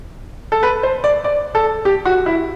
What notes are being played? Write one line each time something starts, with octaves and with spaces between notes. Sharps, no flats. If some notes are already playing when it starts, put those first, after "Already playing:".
A4
B4
C5
D5
D5
A4
G4
F#4
E4